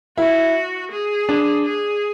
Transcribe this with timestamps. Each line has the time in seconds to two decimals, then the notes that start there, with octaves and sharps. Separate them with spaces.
0.17 E4 F#4
0.91 G#4
1.29 D4
1.66 G#4